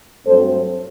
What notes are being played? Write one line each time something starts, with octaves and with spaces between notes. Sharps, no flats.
G2 F#3 A3 C4 A4 C5